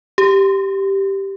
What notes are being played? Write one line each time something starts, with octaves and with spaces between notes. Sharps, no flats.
G4